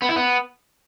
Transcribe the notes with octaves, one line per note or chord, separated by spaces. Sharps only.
B3
E4
B3